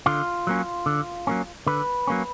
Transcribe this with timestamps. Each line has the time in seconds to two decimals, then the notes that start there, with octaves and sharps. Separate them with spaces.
0.06 D3 F4
0.47 F#3 A#3 C#4
0.86 D3
1.27 F#3 A#3 C#4
1.67 D3 B4
2.07 F#3 A#3 C#4